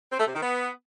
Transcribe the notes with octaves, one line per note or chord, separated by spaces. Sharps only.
C4
A3
C3
D#3
B3